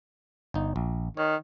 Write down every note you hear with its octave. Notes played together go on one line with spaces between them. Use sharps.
G1 D#4
A#1
D#3 C#5